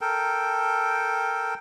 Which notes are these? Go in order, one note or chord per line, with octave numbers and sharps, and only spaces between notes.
A4 A#4 G5